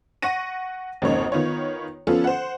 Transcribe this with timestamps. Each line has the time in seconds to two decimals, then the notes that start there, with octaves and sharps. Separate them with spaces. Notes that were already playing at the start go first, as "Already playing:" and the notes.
0.22 F#5 C#6 A#6 D#7
1.02 G#1 F2 C#3 A#3 D#4 C#5
1.32 D#3 B3 F4 C#5
2.07 F3 B3 C#4 F4 A4
2.24 C5 F#5